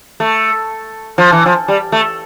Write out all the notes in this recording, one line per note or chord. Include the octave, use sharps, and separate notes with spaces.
A3
F3
E3
F3
G3
A3